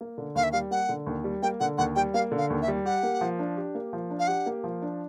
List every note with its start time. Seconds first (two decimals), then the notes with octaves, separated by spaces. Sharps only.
0.01 A#3
0.18 D3
0.35 D#2 F5
0.44 E5
0.52 G3 F5
0.71 A#3 F#5
0.89 D3
1.07 D#2
1.24 G3
1.43 A#3 G5
1.60 D3 F#5
1.78 D#2 F#5
1.96 G3 G5
2.14 A#3 F5
2.32 D3
2.38 F5
2.50 D#2
2.62 E5
2.68 G3
2.85 G4 F#5
3.03 A#3
3.21 F3
3.39 D4
3.57 G4
3.75 A#3
3.93 F3
4.10 D4
4.19 F5
4.27 G4 F#5
4.46 A#3
4.64 F3
4.82 D4